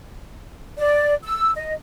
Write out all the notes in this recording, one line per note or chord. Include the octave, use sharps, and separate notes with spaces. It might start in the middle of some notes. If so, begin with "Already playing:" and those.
D5
E6
D#5